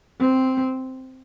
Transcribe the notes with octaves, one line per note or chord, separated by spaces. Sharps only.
C4